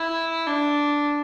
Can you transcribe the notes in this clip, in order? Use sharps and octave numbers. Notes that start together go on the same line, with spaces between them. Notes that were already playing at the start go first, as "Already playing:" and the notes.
Already playing: E4
D4